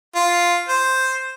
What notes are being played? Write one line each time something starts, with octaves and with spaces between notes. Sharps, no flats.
F4
C5